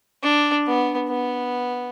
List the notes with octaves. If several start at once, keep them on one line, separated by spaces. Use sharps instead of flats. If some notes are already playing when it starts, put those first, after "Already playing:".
D4
B3
B3